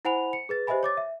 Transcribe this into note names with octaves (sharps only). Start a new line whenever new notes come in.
E4 C5 F#5 G#5 B5 F7
C#7
G#4 B4 A6
G4 C5 D#5 E5 G#5 B5
C#5 D6 A6
E5